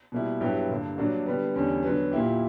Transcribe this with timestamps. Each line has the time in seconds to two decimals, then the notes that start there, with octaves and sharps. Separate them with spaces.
0.12 B2 G3 A#3 E4
0.41 G2 F#3 B3 E4 G4
0.69 G2 D3 A#3
0.98 G2 F#3 A#3 D4 F#4
1.26 D3 G3 B3
1.54 E2 D3 G3 C#4
1.83 D3 F#3 B3
2.11 A#2 A#3 E4 G4